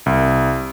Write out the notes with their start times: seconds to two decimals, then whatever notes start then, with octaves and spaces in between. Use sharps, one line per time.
0.06 C2